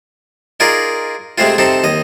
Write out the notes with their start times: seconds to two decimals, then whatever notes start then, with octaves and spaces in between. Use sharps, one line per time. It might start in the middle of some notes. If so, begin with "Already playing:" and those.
0.60 D#4 F4 G#4 A#4 D5
1.38 C3 G#3 A3 C4 F4
1.58 C3 C4 D#4 A4
1.84 D#2 D#5